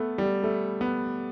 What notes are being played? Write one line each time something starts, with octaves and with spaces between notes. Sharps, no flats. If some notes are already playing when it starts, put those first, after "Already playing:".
Already playing: A3 B3
G3
A3
B3